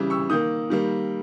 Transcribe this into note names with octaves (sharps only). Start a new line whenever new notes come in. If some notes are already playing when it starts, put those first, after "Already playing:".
Already playing: C#3 E3 G3
C#6 E6
D#3 A#3 D#6 G6
D#3 G3 A#3